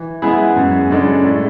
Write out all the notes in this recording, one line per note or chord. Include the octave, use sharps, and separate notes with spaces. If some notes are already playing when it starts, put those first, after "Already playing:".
Already playing: E3
G#3 B3 E4 G#4
F#2
C#3 G#3 D4 A4
A2